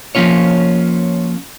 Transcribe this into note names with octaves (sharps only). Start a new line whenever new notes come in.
F3 A#3 C#4 F4 C#5